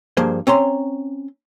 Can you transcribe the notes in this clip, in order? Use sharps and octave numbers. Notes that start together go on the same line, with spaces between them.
G2 F3 A#3 G#4 C5
C4 C#4 A#5 C6